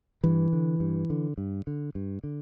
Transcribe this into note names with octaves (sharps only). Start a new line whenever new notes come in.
G2 E3
D3
G2
D3
G2
D3
G2
D3